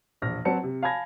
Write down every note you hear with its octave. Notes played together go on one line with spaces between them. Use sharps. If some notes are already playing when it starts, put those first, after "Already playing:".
E1 A#1 F6 A#6
F#3 C4 B4 F#5 A5 C#7
C3
F5 G#5 A5 B5 G#6 A#6